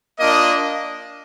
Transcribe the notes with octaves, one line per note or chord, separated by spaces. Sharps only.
A#3 D4 F4 D#5